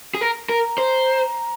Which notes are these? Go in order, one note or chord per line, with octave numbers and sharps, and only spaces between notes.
G#4
A#4
A#4 A#5
C5